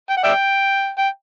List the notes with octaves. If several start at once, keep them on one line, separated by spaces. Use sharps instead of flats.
G5
F#5
D5 E5 G5
G5